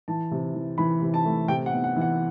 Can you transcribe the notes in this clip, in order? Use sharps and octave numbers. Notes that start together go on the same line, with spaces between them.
E3 A5
C3
E3
E3 B5
C3
A5
A3
C3 G5
F#5
B3
F#5
E3
F#5